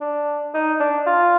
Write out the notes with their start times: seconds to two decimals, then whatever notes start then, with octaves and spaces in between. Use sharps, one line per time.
0.01 D4
0.54 D#4
0.80 D4
1.07 F4